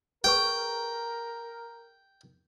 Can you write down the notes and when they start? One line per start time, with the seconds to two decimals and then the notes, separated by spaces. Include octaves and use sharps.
0.24 G#4 A#4 B4 G5 C#6